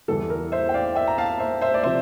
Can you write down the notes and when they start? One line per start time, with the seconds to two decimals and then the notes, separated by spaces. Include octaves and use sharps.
0.08 E2 E3 G3 A4
0.30 A#4
0.52 C5 E5
0.69 G5
0.74 D5 F5
0.95 E5 G5
1.08 A#5
1.18 F5 A5
1.40 C5 E5
1.61 C5 E5
1.74 D5
1.83 C3 F3 C5 E5